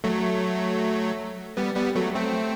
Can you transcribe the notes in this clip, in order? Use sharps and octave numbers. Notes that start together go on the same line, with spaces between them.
F#3 A3
G3 B3
G3 B3
F#3 A3
A3 C4